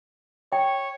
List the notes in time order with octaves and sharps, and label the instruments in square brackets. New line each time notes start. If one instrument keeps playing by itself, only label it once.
[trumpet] C#5 [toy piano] G5